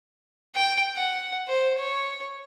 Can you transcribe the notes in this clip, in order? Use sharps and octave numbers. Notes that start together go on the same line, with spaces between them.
G5
F#5
C5
C#5